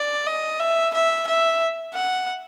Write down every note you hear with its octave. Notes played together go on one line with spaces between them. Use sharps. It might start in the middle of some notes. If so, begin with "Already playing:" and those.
Already playing: D5
D#5
E5
E5
E5
F#5